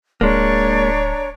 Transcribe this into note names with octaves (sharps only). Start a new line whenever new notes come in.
D1 G#3 A#3 D4 C#5 A#5